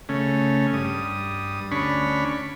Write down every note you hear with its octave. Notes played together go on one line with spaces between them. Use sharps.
C#3 A3 C#4
G2 D#6
D2 C#4 D4 B5 C#6